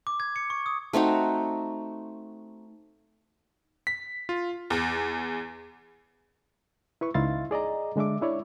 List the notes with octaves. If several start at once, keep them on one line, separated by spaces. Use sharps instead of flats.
D6
G#6
C#7
C#6
D#6
A3 C4 D#4 F#4
B6
F4
E2
E4 B4 C#6
C#2 D#4 E4 F5 C6 A6
G#4 D5 D#5 A#5
D3 G#3 D4 E5 D6
D4 E4 C#5 D5